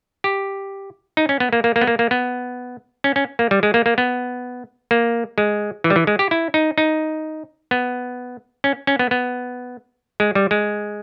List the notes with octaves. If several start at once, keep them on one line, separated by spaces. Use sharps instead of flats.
G4
D#4
C#4
B3
A#3
A#3
A#3
B3
A#3
A#3
B3
C#4
C#4
A#3
G3
G#3
A#3
A#3
B3
A#3
G#3
E3
G3
E3
G#3
G4
E4
D#4
D#4
B3
C#4
C#4
B3
B3
G#3
G3
G#3